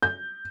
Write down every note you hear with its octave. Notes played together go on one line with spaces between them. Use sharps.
G6